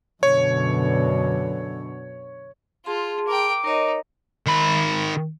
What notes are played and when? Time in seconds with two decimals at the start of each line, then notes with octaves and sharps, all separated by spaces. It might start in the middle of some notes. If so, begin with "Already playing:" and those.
0.23 F#2 B2 D3 C#5
2.86 F4 G#4 A5 C6
3.28 A#4 G5 D6
3.64 D#4 A#4 C#5 D#5
4.46 D#3 B5